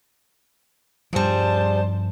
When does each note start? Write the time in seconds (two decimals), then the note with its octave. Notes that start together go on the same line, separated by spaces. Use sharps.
1.13 G2 F3 G3 G#4 C5 A5